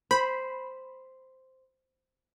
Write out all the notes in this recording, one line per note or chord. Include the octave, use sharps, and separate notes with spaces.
C5 B5